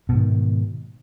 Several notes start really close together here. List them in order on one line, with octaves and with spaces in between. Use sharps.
B2 G#2 D#3